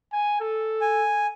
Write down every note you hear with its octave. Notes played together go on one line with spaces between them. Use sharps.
G#5
A4
G#5